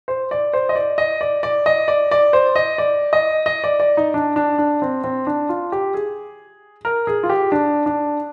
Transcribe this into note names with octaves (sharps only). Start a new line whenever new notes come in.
C5
D5
C5
D#5
D5
D#5
D5
D5
D#5
D5
D5
C5
D#5
D5
D#5
D#5
D5
D5
D#4
D4
D4
D4
C4
C4
D4
F4
G4
G#4
A#4
G#4
F4
G4
D4
D4